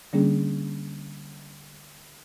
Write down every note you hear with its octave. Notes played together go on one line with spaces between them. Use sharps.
D3 G3 A#3 C#4 D4 G#4